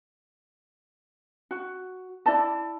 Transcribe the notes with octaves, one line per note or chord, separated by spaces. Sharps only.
F#4
E4 D5 A5